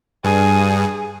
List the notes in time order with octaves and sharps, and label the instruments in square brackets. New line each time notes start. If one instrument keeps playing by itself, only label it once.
[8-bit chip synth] G2 [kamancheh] G#4